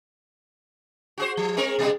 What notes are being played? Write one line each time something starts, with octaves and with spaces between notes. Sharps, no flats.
F#4 G#4 C5
F3
G#3 C4 A#4
B2 G3 G#3